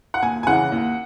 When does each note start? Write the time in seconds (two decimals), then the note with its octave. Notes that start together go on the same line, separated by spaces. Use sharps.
0.14 F#5
0.22 D#2 G#5
0.43 G#5
0.47 C#3 E3 F#5
0.72 D#2